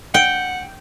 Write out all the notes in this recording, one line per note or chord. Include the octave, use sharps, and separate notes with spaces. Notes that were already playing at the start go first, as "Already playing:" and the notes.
F#5 G5